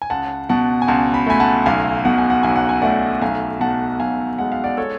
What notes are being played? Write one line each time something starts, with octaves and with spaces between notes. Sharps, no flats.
G#5
C#2 F#5 A5
B2 F#5 A5
G#5
C#2 F#5 A5
B5
A3 G#5 B5
F#5 A5
B1 F5 G#5
B2 F#5
G#5
F#5
B1 G#5
F#5
G#5
A3 D5 F#5
B1 F5 G#5
B2 F#5 A5
B1 F5 G#5
G#3 F#5
F5
D5 F#5
A4 C#5